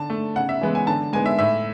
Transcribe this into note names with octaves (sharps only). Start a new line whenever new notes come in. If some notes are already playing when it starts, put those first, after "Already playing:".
Already playing: D3 A5
A3
C#3 F#5
E5
E3 G#3 B3
G#5
D3 A5
G#3 B3 G#5
E5
A2 E5